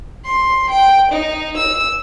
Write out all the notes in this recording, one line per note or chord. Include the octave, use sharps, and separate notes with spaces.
C6
G5
D#4
E6